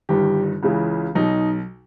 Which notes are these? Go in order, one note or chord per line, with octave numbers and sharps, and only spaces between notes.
G1 G2 D#3 G4
C#2 C#3 E3
B1 B2 D#4